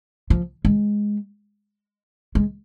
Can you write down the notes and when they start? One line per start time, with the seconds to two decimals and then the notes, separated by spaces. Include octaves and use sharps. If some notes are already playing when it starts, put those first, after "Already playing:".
0.30 F3
0.65 G#3
2.35 G#3